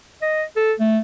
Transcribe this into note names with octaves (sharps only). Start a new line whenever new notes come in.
D#5
A4
A3